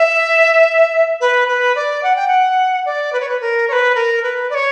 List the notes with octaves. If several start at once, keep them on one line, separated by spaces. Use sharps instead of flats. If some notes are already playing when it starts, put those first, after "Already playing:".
Already playing: E5
B4
B4
D5
F#5
G5
F#5
D5
B4
C#5
B4
A#4
C#5
B4
A#4
B4
D5
C#5